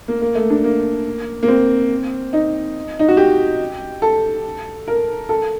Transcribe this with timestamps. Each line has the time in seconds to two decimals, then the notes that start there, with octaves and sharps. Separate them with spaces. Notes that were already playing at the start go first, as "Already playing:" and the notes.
0.08 A#3
0.21 A#3
0.35 A3
0.50 D4
0.64 A#3
1.43 A#3
1.48 C4
2.33 D#4
2.99 D#4
3.08 F#4
3.17 G4
4.02 A4
4.87 A#4
5.29 A4